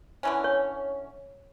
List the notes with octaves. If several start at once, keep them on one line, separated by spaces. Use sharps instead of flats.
D3 E3 C#4
C#5